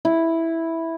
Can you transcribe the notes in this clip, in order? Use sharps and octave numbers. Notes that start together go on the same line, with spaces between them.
E4